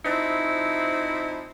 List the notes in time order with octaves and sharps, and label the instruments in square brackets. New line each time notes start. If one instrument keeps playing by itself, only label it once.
[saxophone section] F3 C4 D#4 E4